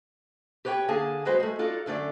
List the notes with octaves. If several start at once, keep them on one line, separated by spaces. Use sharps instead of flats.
G4 B4 C#5 F5 G5
D3 A#3 G#4 G#5 A5
E2 F#3 G#3 F#4 B4 C5
G#3 A3
D#4 F4 F#4 A4 D5
F#2 D3 A3 D5